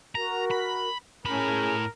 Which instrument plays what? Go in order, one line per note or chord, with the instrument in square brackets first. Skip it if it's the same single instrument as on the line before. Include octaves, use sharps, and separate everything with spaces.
[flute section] F#4 A#4 [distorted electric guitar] A#5
[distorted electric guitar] B5
[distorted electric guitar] A2 B5 [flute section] C#4 G#4 [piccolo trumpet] A#4